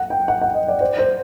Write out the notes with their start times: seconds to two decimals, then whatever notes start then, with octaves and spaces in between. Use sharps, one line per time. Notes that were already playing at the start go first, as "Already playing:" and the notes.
Already playing: F#5
0.10 G5
0.28 F#5
0.41 F#5
0.54 D#5
0.68 D5
0.81 C5
0.99 C5